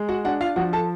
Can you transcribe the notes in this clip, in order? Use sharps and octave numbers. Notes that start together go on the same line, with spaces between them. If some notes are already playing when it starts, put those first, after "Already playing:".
Already playing: G#3
F#4 F#5
D4 F#4 F#5
F4 F5
F3 F#4 F#5
A4 A5